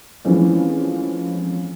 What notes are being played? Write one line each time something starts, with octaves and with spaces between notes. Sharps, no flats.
E3 F3 G#3 A3 C4 C#4